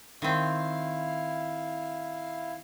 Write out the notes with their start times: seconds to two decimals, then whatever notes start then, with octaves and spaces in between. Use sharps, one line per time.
0.22 D#3 C4 E4 F5